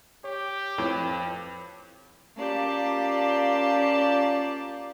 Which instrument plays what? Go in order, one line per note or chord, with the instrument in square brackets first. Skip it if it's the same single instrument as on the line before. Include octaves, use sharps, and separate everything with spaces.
[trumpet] G4 [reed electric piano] C#5
[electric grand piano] F2 [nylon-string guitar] E4 [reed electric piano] B4 C#5
[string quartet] A#3 C#4 F4 G4 D5 A5